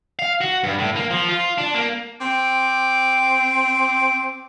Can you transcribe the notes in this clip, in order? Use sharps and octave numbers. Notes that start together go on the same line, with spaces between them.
F5
F#4
G2
A2
A#3
F3
F4
D4
A#3
C4 D6